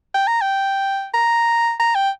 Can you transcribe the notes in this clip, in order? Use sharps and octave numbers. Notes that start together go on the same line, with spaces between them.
G5
A#5
G5
A#5
A#5
G5